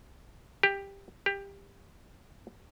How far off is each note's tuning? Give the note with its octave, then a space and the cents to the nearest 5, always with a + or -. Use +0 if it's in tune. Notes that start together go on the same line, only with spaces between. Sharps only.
G4 +15
G4 +20